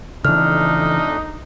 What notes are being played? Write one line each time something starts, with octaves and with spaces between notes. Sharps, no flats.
F2 C#3 E3 A3 D4 D#4 F6